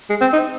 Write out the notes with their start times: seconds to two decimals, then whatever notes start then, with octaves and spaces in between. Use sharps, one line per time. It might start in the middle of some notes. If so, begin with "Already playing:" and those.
0.10 G#3
0.21 C4
0.33 D#4